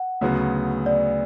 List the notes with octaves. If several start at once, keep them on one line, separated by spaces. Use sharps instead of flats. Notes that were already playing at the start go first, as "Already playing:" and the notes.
Already playing: F#5
D2 C#3 F#3 B3
D5